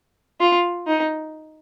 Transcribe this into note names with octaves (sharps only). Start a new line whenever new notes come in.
F4
D#4